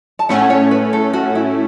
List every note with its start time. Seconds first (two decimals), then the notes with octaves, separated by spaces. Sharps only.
0.19 A5
0.29 A2 A3 C#4 F#5
0.50 C#5
0.71 B4
0.93 A4
1.13 F#4
1.35 E4